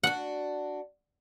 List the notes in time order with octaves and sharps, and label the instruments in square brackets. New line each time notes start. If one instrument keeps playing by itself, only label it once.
[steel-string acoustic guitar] D4 F#4 [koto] F#5